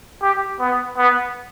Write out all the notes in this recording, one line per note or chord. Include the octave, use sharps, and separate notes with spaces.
G4
B3
B3